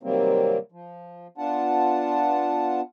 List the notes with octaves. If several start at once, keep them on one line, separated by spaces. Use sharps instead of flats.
C3 D#3 F#3 G3 A#3 C4
F3
B3 D4 F4 F#5 A5